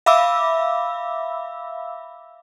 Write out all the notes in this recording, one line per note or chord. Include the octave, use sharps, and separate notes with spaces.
E5 F5 B5 D6 E6